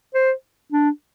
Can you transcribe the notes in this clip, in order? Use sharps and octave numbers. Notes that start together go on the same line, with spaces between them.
C5
D4